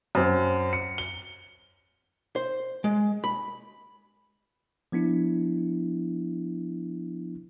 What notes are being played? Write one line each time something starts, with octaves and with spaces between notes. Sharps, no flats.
F#2 C4
C#7
G7
C5
G#3
B5
F3 B3 D4 E4